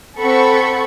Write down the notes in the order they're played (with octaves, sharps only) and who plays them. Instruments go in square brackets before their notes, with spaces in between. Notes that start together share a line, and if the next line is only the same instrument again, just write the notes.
[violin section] C4 A4 F#5 B5 C#6 C#7